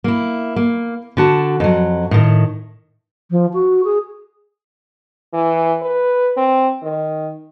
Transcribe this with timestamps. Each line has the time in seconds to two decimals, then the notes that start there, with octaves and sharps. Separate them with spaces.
0.04 A#3 E4
0.56 A#3
1.17 D3 F#4 A5
1.60 F2 F#3
2.11 A2 D#3
3.30 F3
3.53 F#4
3.84 G#4
5.34 E3
5.82 B4
6.37 C4
6.83 D#3